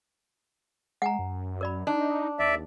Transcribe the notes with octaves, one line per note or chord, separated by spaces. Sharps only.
G#3 F#5 G#5 A#5
F#2
A#4 D5 B5
D4 D#4
D#2 D5 E5